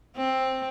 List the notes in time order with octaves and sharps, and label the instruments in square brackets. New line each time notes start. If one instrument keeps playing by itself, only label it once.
[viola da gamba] C4